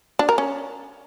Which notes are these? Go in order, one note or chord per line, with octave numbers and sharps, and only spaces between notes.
D4
A#4
C#4